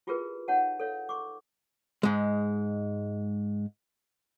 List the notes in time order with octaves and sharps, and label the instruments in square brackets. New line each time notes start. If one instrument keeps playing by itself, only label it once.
[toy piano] E4 F4 G4 G#4 A#4 B4
D#4 C#5 F#5 A5
A4 C#5 F5
C#6 D6
[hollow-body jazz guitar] G#2 G#3